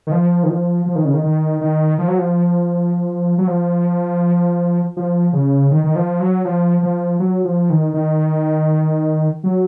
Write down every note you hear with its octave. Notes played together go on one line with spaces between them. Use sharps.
D#3
F3
D#3
F3
F3
D#3
C#3
D#3
D#3
D#3
F3
F#3
F3
F#3
F3
F3
C#3
D#3
D#3
F3
F#3
F3
F3
F#3
F3
D#3
D#3
F#3